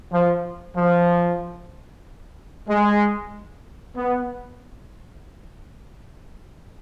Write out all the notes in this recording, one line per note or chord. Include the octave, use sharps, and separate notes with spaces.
F3
F3
G#3
B3